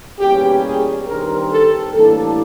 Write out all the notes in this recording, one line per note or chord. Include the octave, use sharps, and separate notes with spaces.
E2 B2 G3 A#3 C#4 G4
G#4
G2 D#3 G3 C4 A#4
A4
A2 E3 G3 A#3 D4 A4